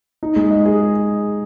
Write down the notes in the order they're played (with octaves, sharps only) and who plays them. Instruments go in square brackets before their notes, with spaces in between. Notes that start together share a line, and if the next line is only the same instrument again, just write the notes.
[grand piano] D#4
G#3
D#5
G#4